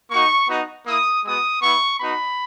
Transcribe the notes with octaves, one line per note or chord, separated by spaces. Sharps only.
A#3 D#4 F#4 C#6
B3 D#4 F#4
A#3 E4 D#6
G#3 B3 F#4 D#6
B3 E4 C#6
B3 D#4 F#4 B5